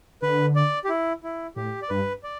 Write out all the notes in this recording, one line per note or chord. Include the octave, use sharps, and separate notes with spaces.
D3 B4
D5
G4
E4
E4
A2 G4
D5
G2 B4
D5